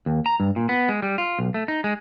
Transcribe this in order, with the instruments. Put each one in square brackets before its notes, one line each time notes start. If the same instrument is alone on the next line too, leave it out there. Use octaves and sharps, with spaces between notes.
[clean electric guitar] D#2
A#5
G2
A#2
B3
G#3
G3
F4
B1
A3
D#4
G#3